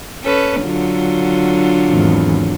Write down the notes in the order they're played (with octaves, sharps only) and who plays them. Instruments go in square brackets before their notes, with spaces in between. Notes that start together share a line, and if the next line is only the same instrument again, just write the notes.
[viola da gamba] C#4 A4 B4
D3 F#3 F4
[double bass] G#1 E2